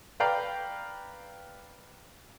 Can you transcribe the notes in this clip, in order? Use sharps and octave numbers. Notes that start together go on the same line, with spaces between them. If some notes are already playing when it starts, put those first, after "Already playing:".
B4 D5 F5 G5 A#5